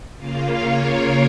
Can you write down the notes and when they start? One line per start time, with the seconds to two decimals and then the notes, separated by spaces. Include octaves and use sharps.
0.17 C#3 A#3 F4 F5
0.49 C#5
0.82 A#4